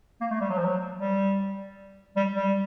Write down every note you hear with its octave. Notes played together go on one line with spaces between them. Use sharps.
A#3
A3
G3
F#3
F3
F#3
G3
G3
G3